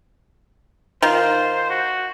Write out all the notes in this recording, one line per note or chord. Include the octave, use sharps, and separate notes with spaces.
D#3 F4 C5
F#4